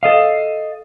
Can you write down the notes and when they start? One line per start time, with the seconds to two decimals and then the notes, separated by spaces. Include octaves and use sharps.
0.03 A4 D#5 F5